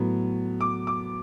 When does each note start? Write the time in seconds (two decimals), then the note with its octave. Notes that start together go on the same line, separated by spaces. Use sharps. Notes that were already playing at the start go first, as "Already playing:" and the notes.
Already playing: A2 F#3 B3
0.61 D6
0.87 D6